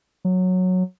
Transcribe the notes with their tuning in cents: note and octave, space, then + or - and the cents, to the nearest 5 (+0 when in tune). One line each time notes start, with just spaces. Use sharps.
F#3 -10